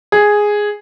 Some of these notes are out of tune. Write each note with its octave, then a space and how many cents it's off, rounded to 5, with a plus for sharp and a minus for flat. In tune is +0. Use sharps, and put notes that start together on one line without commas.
G#4 +0